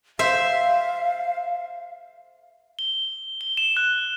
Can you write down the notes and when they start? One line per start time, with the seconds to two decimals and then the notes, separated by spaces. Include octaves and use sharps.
0.19 C5 E5 F5
2.79 G7
3.41 G7
3.57 E7
3.77 F#6